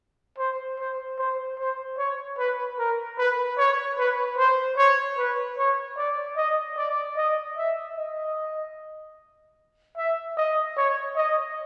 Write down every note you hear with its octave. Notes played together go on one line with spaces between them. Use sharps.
C5
C5
C5
C5
C#5
B4
A#4
B4
C#5
B4
C5
C#5
B4
C#5
D5
D#5
D5
D#5
E5
D#5
E5
D#5
C#5
D#5